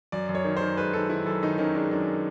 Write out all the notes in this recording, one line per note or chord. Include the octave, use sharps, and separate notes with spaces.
F#2 D5
F#2
C#5
D#3
D#3 C5
G#3 B4
D#3 A4
D#3 E4
F#2 A4
D#3 D#4
D#3 C#4
G#3 D4
F#2 D4